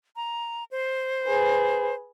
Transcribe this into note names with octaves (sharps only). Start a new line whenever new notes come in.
A#5
C5
G#4 B4